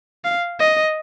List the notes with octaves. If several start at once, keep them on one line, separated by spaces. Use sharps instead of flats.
F5
D#5